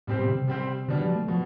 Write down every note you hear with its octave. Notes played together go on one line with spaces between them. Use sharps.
A2 G3 C4 G4 C5
B2
D3
C3
G3 C4 G4 C5
B2 D3 G3 D4
F3
A3
B2 F3